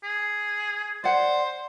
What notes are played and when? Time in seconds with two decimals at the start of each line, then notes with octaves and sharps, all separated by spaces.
0.03 G#4
1.04 C5 D5 F#5